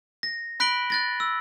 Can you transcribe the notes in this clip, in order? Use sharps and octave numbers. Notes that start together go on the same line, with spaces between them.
A#6
B5 F#6 B6 D7 F#7 G7
F#6 A6 A#6
E6